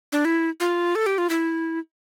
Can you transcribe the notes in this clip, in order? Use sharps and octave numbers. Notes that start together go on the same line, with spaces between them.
D4
E4
F4
A4
G4
F4
E4